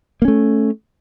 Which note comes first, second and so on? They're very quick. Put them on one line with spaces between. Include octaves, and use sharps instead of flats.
A#3 C#4 A3